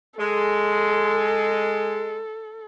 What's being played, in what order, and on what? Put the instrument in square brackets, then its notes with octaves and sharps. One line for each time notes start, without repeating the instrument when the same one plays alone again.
[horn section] G#3 [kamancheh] A4